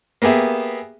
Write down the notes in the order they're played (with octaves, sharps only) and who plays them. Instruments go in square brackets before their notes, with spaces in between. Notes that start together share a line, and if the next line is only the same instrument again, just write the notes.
[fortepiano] A#3 B3 G4 G#4 E5